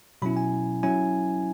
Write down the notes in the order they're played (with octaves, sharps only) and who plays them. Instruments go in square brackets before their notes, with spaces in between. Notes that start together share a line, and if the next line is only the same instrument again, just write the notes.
[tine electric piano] B2 F#3 C#4 E4 B5
G#5
F#3 C#4 E4 G#5